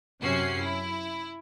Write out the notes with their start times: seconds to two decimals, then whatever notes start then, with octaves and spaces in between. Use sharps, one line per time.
0.21 F#2 C3 C#4 F#4 C7
0.61 E4